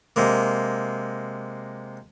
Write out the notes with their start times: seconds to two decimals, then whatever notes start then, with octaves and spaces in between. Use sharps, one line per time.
0.16 C3 G#3 A#3